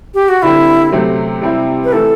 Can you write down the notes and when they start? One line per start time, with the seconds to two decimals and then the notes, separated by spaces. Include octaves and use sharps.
0.14 G4
0.29 F#4
0.42 D3 G3 C4 E4
0.92 C3 F#3 A3 C4
1.42 C3 G3 C4 E4
1.84 B4
1.92 E3 A3 E4 A4